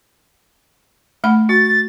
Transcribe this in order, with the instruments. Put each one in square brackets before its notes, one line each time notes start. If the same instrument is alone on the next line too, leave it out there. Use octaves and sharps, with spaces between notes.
[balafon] A3 F#5 B5
[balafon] F#4 [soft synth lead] A6